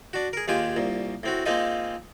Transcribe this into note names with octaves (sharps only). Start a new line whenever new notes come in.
D4 F#4
G#4 A#4
D#2 G#3 F4 G4 G#5
C2 A#2
A2 C4 F#4
G#3 A#3 C4 D#4 F4 D#5